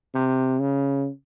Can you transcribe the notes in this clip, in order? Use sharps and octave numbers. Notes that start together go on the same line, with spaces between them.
C3
C#3